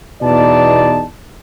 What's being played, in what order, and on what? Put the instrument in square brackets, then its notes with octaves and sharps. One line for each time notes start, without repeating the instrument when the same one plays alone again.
[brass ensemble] E2 B2 D#4 E4 D5 A5